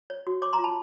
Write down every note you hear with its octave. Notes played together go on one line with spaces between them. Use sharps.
C#5
F#4
C#5 C6 D6
A#5 C6
F4
A5 B5